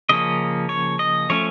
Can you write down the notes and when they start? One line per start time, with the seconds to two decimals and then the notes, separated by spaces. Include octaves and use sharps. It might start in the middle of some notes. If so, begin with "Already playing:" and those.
0.09 C#3 F3 A#3 C#4 D#5
0.69 C#5
0.99 D#5
1.30 F3 A3 C#4 C#5